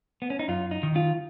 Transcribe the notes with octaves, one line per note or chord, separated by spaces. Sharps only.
B3
C#4
D#4
F#2 F4
D#4
D#3
F4